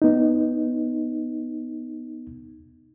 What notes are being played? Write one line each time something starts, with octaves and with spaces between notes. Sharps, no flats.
B3 D#4